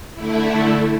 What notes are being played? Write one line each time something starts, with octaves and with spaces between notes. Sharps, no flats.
D3 A3 E4